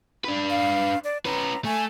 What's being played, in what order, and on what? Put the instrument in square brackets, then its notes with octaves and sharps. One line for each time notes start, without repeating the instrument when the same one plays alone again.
[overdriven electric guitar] D4 B4
[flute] F5
D5
[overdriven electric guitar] C#4 B4 [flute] A#5
[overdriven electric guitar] A3 [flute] G#5